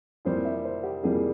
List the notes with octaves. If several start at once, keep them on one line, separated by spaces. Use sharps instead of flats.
F2 E3 G3 A#3 C5
E5
C5
G4
F2 E3 G3 A#3 G#4